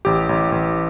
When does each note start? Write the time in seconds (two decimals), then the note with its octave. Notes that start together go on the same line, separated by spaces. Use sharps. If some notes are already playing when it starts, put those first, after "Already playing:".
0.05 A1 G4
0.29 A1
0.52 A1